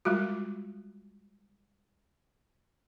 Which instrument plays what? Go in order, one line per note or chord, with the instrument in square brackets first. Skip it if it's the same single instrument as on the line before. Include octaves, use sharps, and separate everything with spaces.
[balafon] G3 G#3 F4 F#4